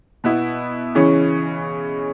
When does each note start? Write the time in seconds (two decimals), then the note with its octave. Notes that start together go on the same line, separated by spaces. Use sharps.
0.24 B2 B3 E4
0.95 C#3 E3 C#4